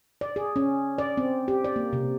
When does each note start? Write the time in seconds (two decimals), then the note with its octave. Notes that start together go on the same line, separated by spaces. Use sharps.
0.21 D5
0.36 G#4
0.56 C#4
0.98 D5
1.17 C4
1.48 G4
1.64 D5
1.76 A#3
1.93 C3